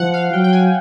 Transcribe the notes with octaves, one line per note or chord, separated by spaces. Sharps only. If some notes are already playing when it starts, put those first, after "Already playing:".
Already playing: F3 F#5
F5
F#3 G5
G5
G#5